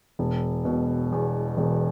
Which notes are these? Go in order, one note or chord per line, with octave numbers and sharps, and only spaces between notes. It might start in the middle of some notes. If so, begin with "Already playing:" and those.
E1
B2
E2
E1